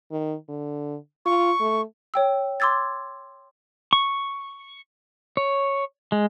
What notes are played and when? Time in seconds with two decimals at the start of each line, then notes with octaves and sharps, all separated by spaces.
0.12 D#3
0.49 D3
1.25 F4 C#6
1.60 A3
2.14 C#5 G5 E6
2.60 C6 D6 E6 G#6 A6
3.93 C#6
5.37 C#5
6.12 G#3